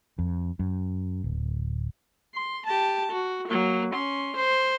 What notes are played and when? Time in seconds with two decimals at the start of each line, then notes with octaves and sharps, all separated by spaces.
0.19 F2
0.59 F#2
1.24 D1
2.35 C6
2.66 G4 A5
3.12 F#4
3.48 F#3 A#3
3.94 C#4 C6
4.37 C5